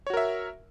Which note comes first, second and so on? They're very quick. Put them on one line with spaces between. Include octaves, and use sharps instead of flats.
C#5 F#4 A#4 E5